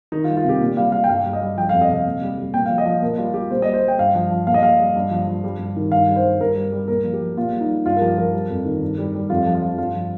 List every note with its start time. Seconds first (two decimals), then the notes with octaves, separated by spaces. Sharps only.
0.12 D#3 D#4
0.24 F4
0.28 G3
0.37 F4
0.44 C3 G4
0.60 A#2
0.77 G3 F5
0.92 G3 F5
1.04 G5
1.08 G2 F5
1.26 G3
1.33 D#5
1.41 G3
1.57 F3 G5
1.69 F2 F5
1.82 D#5
1.89 C3 F5
2.06 A#2
2.22 G3
2.38 G3
2.53 A#2 G5
2.66 F3 F5
2.78 D#5
2.85 F3
3.01 A#2 A#4
3.18 G3 F4
3.34 G3 G4
3.51 A#2 C5
3.62 G3 D#5
3.74 C5
3.82 G3
3.88 G5
3.98 G2 F5
4.15 F3
4.31 F3
4.47 A#2 F5
4.54 D#5
4.62 G3 F5
4.80 G3
4.96 G2
5.11 F3
5.27 F3
5.44 G3
5.59 G2
5.76 D#3
5.92 G2 F5
6.08 G3
6.16 C5
6.24 G3
6.40 G2 A#4
6.56 G3
6.72 G3
6.88 A#2 A#4
7.04 F3
7.13 G4
7.21 F3
7.37 A#2 F4
7.53 G3
7.61 D#4
7.69 G3
7.86 G2 F4
7.96 A#4
8.01 F3 G4
8.18 F3 A#4
8.33 G3
8.49 F2
8.65 D#3
8.82 G2
8.98 G3
9.14 G3
9.30 F2 F4
9.46 F3
9.55 F4
9.62 F3
9.78 G2 F4
9.95 F3